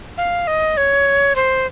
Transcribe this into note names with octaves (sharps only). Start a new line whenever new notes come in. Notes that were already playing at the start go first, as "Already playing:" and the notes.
F5
D#5
C#5
C5